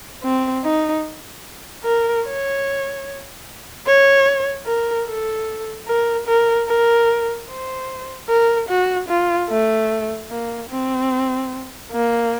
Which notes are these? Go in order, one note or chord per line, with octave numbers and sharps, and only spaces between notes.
C4
D#4
A#4
C#5
C#5
A#4
A4
A#4
A#4
A#4
C5
A#4
F#4
F4
A3
A#3
C4
A#3